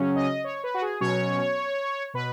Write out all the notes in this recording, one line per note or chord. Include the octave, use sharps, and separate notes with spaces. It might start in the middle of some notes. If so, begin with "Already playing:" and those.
Already playing: C#3 F#3 C#4
D#5
C#5
B4
F#4
G#4
B2 F#3 C#4 C#5
B2 B4